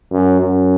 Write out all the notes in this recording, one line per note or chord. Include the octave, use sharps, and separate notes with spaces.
F#2
F#2